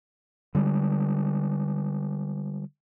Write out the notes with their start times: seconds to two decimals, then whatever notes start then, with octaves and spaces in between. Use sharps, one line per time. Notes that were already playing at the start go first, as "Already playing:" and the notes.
0.55 D3 G3 G#3